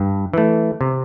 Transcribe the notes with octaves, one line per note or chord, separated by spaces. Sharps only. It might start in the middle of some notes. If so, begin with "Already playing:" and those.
Already playing: G2
E3 A3
C3